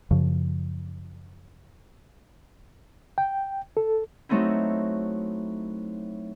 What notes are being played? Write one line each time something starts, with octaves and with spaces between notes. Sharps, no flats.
F#2 C#3 F3
G5
A4
F#3 A3 C4 D#4 E4